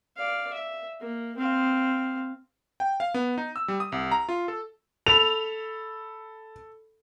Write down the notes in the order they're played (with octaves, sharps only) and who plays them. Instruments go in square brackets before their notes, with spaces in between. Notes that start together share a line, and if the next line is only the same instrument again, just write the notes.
[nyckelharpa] D5 F5
E5
A#3
C4 F5
[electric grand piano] G5
F5
B3
D#4
E6
G3
D#6
C2
A#5
F4
A4
[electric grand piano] A4 B5 [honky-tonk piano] F7